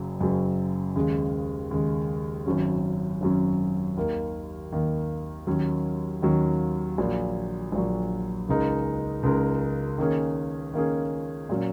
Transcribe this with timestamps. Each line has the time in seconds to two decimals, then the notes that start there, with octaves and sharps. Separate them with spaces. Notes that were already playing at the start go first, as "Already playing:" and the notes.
Already playing: F#1 F#2 C#3 F#3
0.20 F#1 F#2 C#3 F#3
0.95 D#2 C#3 G#3
1.71 D#2 C#3 G#3
2.46 G#1 F#2 F#3 C#4
3.21 G#1 F#2 F#3 C#4
3.97 D#2 D#3 A#3
4.72 D#2 D#3 A#3
5.47 D#2 D#3 F#3 C#4
6.22 D#2 D#3 F#3 C#4
6.98 A#1 A#2 F#3
7.72 A#1 A#2 F#3
8.49 C#2 C#3 G#3 D#4 A#4
9.23 C#2 C#3 G#3 D#4 A#4
9.98 D#3 A#3 C#4 G#4
10.74 D#3 A#3 C#4 G#4
11.49 A#2 F#3 C#4